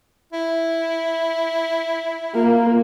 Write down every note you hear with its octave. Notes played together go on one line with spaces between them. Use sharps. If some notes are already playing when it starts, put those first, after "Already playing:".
E4
A#3 F4